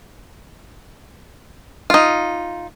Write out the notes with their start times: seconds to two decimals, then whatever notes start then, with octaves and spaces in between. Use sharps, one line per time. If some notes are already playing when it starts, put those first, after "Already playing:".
1.90 D#4 F4